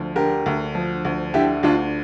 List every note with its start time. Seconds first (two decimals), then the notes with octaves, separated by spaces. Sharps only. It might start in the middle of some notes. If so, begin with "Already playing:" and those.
Already playing: D2 F3
0.15 D3 G4 A#4
0.46 D2
0.75 F3
1.05 D2
1.34 D3 E4 G4
1.63 D2 D4 F4